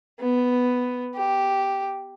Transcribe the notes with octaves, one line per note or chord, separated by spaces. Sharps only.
B3
G4